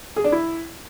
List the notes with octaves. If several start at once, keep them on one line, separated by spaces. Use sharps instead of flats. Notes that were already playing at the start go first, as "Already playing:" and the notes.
G#4
D4
E4